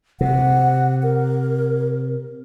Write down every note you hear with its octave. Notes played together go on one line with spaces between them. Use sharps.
C3 F#5
A#4